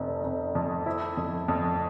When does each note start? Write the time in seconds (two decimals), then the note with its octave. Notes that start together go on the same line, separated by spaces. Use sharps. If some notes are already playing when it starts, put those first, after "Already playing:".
Already playing: F1 F2 B3
0.24 F1
0.55 F2
0.86 E4
1.17 F2
1.48 F2